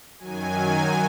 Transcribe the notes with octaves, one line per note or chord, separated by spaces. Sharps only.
F#2 D#3 F#3 G#5